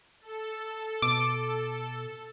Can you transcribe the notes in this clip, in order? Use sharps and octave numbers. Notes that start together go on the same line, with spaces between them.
A4
B2 D6